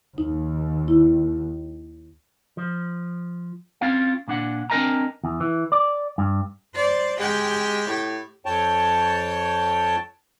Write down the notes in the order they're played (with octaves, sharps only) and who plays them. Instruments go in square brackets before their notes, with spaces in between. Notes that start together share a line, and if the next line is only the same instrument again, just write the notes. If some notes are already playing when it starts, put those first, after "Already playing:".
[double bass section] D#2 [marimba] D#4
[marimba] E4
[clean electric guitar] F3
C4 C#4 F4 F5
A#2 D4 F#5
C4 D4 A#4 D#5 G#5 A#5
E2
E3
D5
G2
[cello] C5 D5
[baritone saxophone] G#3 [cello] G4 G5
[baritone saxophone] A2
[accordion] F2 C#5 G5 A5